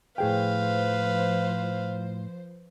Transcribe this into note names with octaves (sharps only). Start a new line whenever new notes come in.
A2 F3 G#4 B4 C5 F5 G5